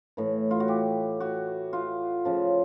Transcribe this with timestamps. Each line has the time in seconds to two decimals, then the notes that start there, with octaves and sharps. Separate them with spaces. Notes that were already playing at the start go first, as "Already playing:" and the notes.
0.17 A2 E3
0.51 F4
0.60 F#4
0.68 G4
1.20 F#4
1.73 F4
2.25 C#3 F3